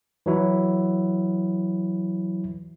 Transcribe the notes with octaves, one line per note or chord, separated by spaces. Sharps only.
E3 F#3 E4